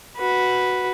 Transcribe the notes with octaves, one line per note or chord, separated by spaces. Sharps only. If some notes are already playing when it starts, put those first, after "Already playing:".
F#4 B4